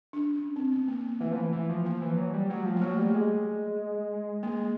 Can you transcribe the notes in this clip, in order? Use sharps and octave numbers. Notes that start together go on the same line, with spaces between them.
D4
C#4
C4
B3
A#3
A#3
E3 A3
F3
E3
E3
F3
F3 A#3
E3
F#3
G3
F#3 A3
F3
A#3
F#3 A3
G3
G#3
G#3 A#3